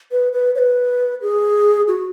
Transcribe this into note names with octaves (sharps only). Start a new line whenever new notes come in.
B4
B4
C#5
B4
G#4
F#4